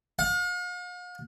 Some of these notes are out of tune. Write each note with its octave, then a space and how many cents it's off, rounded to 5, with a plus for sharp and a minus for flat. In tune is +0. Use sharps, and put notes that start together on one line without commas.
F5 +45